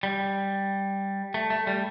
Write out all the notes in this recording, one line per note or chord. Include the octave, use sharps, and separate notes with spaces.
G3
A3
A3
G3